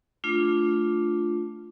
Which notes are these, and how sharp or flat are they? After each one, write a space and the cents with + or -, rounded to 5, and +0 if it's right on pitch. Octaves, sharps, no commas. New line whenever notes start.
A3 +0 D4 +0 F4 +0